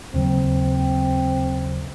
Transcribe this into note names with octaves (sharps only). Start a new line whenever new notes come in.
D#2 C#3 F#3 C4